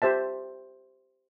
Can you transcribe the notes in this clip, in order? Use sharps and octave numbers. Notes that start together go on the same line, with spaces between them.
G4 C5 E5 A5